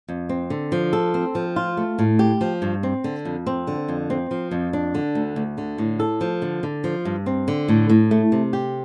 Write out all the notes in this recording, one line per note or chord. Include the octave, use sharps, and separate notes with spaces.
F2
C4
D3
F3
A4
C4
F3
F4
A3
A2
G4
F3
G2
C4
D3
F2
C4
D3
F2
C4
F3
F2
D4
D3
D2
D2
D3
A2
A4
F3
D3
D3
F3
G2
C4
D3
A2
A2
A3
C3
G4